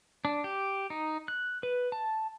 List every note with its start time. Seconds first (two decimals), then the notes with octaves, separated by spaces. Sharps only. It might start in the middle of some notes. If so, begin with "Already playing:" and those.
0.25 D4
0.44 G4
0.90 D#4
1.28 F#6
1.63 B4
1.92 A5